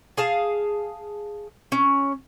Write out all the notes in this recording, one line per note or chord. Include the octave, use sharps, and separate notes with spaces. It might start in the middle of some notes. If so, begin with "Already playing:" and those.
G#4 F5 A5
C#4